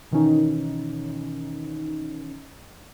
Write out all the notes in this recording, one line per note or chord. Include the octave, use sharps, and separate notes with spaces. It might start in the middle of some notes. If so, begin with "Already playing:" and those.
B2 D#3 E3 C#4 D#4